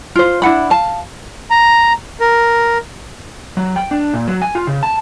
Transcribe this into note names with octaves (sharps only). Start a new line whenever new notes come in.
F4 C5
D4 E4 F#5 B5
F5 A5
A#5
A#4
F#3
G5
D4
A#2
F#3
G#5
F4
C#3
A5